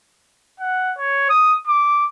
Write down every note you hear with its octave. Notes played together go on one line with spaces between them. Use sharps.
F#5
C#5
D#6
D6